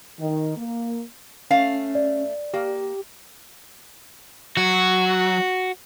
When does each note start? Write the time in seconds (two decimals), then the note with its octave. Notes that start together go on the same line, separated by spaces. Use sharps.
0.20 D#3
0.57 A#3
1.51 A3 C#4 F5
1.95 D5
2.54 A#3 G4
4.57 F#3 F#4